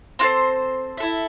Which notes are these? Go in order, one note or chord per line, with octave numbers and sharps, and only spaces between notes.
C4 F4 A4 C5
E4 A4 E5